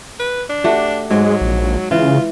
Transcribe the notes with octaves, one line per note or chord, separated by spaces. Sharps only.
B4
D4
A3 F#4 G4
G#2 F#3 G#3
A#1
C#3 E3 F4